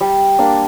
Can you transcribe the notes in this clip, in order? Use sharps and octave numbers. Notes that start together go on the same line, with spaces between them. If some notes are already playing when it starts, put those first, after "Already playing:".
G3
A#3 D4